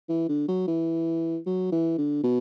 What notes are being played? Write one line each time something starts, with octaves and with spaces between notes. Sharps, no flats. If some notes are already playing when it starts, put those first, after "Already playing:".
E3
D3
F#3
E3
F#3
E3
D3
B2